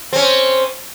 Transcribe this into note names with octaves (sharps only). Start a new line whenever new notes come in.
C4 C#4